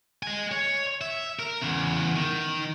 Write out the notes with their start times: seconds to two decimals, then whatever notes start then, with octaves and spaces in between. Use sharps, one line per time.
0.23 D#5 G#5
0.52 C#5
1.01 E5
1.39 A#4
1.62 E2 C#3
2.15 D#3